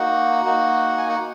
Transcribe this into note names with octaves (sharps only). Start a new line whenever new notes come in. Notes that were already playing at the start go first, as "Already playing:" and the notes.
Already playing: A#3 D#4 F#4 F#5
A#3 D#4 F#4
G#5
F#5